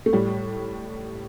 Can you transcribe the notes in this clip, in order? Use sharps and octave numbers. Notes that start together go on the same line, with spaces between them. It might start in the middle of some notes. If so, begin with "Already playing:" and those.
A3
A2 G3